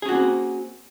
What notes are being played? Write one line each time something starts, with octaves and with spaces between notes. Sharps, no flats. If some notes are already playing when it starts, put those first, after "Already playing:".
A#3 C4 C#4 F#4 G#4